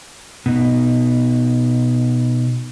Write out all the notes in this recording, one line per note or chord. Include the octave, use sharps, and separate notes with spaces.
B2 D#4